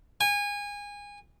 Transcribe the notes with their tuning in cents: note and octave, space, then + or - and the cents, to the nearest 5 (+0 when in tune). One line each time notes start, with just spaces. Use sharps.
G#5 -25